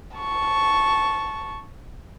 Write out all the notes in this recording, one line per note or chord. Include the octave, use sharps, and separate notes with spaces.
A5 C#6